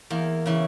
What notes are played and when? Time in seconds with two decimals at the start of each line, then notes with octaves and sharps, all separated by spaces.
0.10 E2 A#3
0.46 C#3 E3